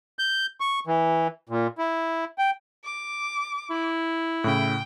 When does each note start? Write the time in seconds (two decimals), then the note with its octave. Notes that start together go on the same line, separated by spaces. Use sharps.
0.19 G6
0.60 C#6
0.87 E3
1.49 A#2
1.78 E4
2.38 G5
2.85 D6
3.70 E4
4.44 A2 C#3 G5